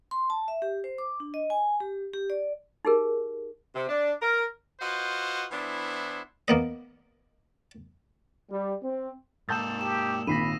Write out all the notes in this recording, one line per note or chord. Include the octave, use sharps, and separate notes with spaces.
C6
A5
E5
G4
C5
D6
D4
D#5
G#5
G4
G4
D5
D#4 G4 G#4 A#4
C3
D4
A#4
F4 F#4 B4 C5 D#5
E3 B3 D4 E4 C5
A#3 B3 D#5
G3
C4
G#2 A#3 A5 D#6 E6 G6 A6 E7
G4 E7
G#1 A#2 B5 A#6 C7 D#7